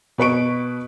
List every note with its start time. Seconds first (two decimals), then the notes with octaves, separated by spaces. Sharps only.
0.18 B2 B4 C#6 D7